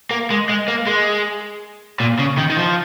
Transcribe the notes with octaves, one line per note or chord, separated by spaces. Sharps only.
A#3
G#3
G#3
A#3
G#3
A#2
C#3
D#3
D#3
F3